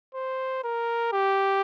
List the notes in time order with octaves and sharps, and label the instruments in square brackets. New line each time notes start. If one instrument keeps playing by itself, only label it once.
[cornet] C5
A#4
G4